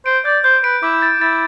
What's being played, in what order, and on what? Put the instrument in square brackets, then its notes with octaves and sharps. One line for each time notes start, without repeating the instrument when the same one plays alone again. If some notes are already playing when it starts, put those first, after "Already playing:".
[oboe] C5 [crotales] D7
[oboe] D5 [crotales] G6
[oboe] C5 [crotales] G6
[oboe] B4 [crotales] D7
[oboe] E4 [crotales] D6
[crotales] A6
[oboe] E4 [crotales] A6